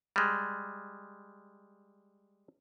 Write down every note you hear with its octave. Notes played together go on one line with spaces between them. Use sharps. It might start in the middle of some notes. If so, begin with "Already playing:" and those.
G3 G#3